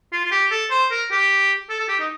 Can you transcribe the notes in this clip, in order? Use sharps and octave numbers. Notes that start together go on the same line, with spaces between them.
F4
F4
G4
A4
C5
A#4
G4
A4
A4
G4
D#4